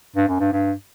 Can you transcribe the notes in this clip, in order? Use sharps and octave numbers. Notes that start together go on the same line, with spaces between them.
G2
F#2
G2
G2